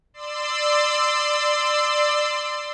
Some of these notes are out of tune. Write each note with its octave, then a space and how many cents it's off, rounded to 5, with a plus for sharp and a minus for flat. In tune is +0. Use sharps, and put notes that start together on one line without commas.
D5 +20 C6 -15 E6 +0